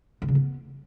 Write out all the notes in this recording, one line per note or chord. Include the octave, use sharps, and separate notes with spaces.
D3
C#3
B3